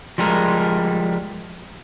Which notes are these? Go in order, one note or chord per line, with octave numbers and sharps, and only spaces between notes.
F3 G3 G#3 A#4